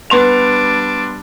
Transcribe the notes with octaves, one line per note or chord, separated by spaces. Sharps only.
G3 B3 D4 C6 F7